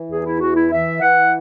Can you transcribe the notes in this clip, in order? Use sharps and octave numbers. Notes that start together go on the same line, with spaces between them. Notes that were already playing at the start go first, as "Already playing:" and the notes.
Already playing: E3
E2 G#4
E4
E3 F#4
E4
E3 E5
E3 F#5